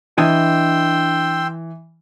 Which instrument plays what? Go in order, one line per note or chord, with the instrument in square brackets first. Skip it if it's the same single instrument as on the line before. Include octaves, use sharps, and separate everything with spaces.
[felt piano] E3 [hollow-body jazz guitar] D4 D#5 G#5 [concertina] G5 C6 E6